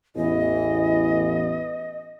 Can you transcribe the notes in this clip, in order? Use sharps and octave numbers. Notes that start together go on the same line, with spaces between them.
A1 E2 E3 D#5